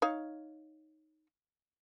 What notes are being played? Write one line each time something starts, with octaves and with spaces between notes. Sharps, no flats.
D#4 C#5 F5